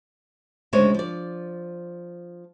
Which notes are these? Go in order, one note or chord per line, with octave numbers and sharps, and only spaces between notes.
D2 C#3 G#3 C5 C#5
F3 D5